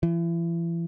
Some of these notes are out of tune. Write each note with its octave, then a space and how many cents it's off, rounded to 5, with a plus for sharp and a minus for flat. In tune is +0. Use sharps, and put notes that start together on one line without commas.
E3 +35